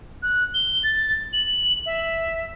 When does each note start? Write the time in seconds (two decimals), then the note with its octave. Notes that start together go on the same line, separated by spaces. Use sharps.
0.23 F#6
0.54 G7
0.83 A6
1.33 F#7
1.86 E5